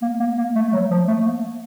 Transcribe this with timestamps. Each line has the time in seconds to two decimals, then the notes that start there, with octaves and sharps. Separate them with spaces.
0.02 A#3
0.20 A#3
0.37 A#3
0.55 A3
0.68 A3
0.73 F#3
0.91 F3
1.08 A3
1.26 A#3